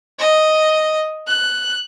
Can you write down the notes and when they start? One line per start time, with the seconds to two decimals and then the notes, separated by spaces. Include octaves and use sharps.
0.19 D#5
1.27 F#6